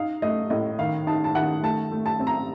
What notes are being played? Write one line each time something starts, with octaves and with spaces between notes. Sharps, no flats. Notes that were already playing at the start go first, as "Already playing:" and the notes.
Already playing: D#4 F5
A3 D#5
A2 D#5
D#3 F5
D#4 A5
A5
D#3 F#5
A3 A5
A3
A5
C4
A#5